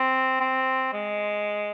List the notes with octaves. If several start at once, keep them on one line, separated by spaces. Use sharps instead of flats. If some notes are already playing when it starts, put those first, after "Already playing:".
Already playing: C4
C4
G#3